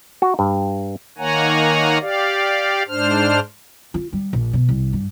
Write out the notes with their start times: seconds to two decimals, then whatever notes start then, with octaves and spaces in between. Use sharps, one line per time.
0.22 F#4
0.39 G2
1.18 D#3 A#3 C#5 F#5 G#5 A#5
2.01 G4 D5 F5
2.88 G#2 D4 C5 F6
3.94 F4
4.13 G3
4.33 A#1
4.53 B2
4.69 C2
4.93 G2